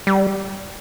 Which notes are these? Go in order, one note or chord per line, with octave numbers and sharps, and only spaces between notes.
G3